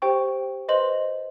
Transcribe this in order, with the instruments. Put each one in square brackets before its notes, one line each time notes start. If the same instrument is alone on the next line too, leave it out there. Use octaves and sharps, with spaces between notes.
[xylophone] G4 C5 G5 C#6
B4 C5 D#5 C6 F#7